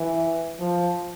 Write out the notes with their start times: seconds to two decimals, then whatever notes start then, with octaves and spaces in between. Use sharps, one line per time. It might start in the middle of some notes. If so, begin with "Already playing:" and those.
Already playing: E3
0.59 F3